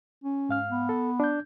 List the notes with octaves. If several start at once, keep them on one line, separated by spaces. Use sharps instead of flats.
C#4
G#2 F5 F6
B3
A4
D4 G6